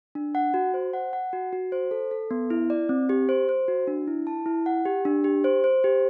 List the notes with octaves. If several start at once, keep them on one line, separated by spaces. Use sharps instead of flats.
D4
F#5
F#4
C5
F#5
F#5
F#4
F#4
C5
A4
A4
B3
E4
D5
C4
G4
C5
C5
F#4
D4
E4
A5
E4
F#5
G4
D4
G4
C5
C5
G4